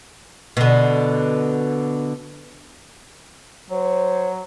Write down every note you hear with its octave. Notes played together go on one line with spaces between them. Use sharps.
B2 D3
F#3 C5 C#5